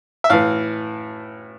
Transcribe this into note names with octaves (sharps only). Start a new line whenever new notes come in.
E5
A2 E3 F5